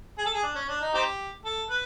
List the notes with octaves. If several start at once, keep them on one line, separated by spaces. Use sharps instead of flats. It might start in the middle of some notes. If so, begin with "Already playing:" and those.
G#4
A4
G#4
D4
C#4
D4
D#4
C4 D#4 G4
A4
B4